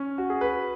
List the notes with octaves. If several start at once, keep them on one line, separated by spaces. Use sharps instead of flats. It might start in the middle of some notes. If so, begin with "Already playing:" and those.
Already playing: C#4
F#4
G#4
B4